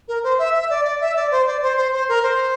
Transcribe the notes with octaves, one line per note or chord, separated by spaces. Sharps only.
A#4
C5
E5
E5
D5
D5
E5
D5
C5
D5
C5
C5
C5
A#4
C5